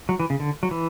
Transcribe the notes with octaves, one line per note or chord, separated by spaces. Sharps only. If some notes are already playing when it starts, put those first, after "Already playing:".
F#3
E3
C#3
D3
F#3
E3